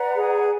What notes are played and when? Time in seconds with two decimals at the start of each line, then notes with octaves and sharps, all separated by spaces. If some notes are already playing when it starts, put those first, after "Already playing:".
Already playing: B4 D5 F#5 A#5
0.16 G#4